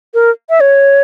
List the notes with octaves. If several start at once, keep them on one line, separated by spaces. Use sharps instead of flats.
A#4
E5
C#5